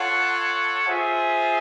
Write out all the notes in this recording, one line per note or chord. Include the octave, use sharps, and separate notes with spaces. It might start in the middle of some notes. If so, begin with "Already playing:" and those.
Already playing: F4 A4 C#5 F#5
F4 G#4 C5 E5